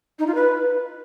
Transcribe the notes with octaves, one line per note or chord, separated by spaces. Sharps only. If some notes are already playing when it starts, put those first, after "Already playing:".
D#4
F4
B4